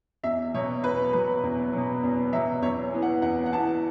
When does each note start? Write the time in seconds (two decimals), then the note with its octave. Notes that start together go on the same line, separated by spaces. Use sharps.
0.24 E2 E5
0.54 B2 F#3 C#5
0.83 E2 B4
1.13 B2 F#3 B4
1.43 E2
1.73 B2 F#3
2.03 E2
2.33 F#3 E5
2.37 B2
2.62 E2 C#5
2.93 E3 B3
3.02 F#5
3.22 E2 F#5
3.46 F#5
3.52 E3 B3 A5